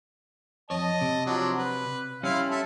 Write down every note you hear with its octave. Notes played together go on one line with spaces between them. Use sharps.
F2 C#5 D#5 A5
C3
F3 F#3 D4
B4
G3 C#4 E4 F5 C6
A4 E5